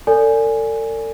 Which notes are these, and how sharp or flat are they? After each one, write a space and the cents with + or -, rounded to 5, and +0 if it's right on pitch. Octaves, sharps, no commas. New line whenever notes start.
A4 +40 D5 -25 G#5 +0